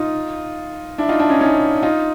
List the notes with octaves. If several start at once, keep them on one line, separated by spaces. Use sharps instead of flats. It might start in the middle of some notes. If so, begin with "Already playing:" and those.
Already playing: D#4 F4
D4 E4
D#4 F4
D4 E4
C#4 D#4
C#4 D#4
D#4 F4